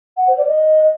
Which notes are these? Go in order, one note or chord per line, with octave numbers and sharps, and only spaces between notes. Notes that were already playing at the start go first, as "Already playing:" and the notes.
F#5
C5
D5
D#5